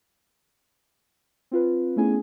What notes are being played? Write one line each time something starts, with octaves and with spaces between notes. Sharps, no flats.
C4 F4 B4
A3 B3 C#4 E4 G#4 G#5